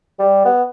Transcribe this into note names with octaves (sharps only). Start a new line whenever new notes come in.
G3
B3